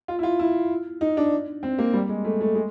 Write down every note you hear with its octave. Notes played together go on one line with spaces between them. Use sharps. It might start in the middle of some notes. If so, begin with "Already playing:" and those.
F4
E4
F4
E4
D#4
D4
C4
A#3
G3
G#3
A3
A3
G#3